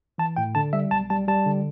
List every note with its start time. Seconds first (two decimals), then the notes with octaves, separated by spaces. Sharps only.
0.18 E3 A5
0.36 A2 G5
0.55 D3 A5
0.73 G3 E5
0.91 B1 A5
1.10 G3 A5
1.28 G3 A5
1.46 D3